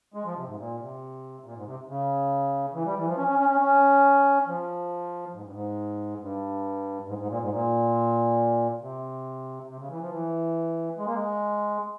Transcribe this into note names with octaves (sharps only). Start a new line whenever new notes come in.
G#3
F3
C3
G#2
A#2
C3
A#2
G#2
C3
C#3
E3
G3
E3
F3
C#4
C#4
C#4
C#4
C#4
F3
G#2
G2
G#2
G2
G#2
G#2
A#2
G#2
A#2
C3
C3
C#3
E3
F3
E3
G#3
A#3
G#3